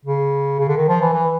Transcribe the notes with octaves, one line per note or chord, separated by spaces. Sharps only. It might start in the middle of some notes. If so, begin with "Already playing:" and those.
C#3
C#3
D3
D#3
F3
E3
E3